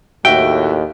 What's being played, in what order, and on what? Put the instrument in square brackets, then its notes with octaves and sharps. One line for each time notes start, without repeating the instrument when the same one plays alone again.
[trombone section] D#2 A2 [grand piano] F#4 E5 [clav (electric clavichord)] G5